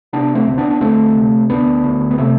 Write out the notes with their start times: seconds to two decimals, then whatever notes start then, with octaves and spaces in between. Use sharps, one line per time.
0.13 C3 B3 D4
0.35 A3 C4
0.47 D2
0.58 B3 D4
0.70 D4
0.80 D2 A3 C4
1.15 C3
1.50 D2 B3 D4
1.84 D2
2.11 B3
2.18 C3 A3 C4